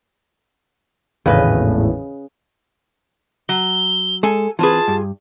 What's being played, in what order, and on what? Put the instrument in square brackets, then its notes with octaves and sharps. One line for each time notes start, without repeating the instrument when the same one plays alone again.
[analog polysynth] G#1 E2 A2 [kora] C#3 B4 D#5
[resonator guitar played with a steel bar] F#3 [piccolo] G7
[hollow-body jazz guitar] G#3 [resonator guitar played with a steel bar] A4 G#5
[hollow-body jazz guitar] E3 C4 B4 [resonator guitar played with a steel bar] F4 G#4 [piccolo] A5
[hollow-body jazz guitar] G2